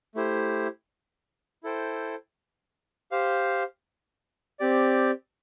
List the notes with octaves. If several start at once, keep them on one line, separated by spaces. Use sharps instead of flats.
A3 E4 G4 C5
E4 A4 C5 G5
G4 C5 F5
C4 G4 D5